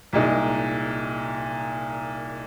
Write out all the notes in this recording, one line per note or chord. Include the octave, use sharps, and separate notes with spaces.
C2 A#2 G#3 D#4